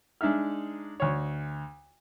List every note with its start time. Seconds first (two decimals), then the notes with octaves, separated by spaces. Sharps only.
0.21 G#3 D4 D#4 E5 F6
1.00 D2 C#5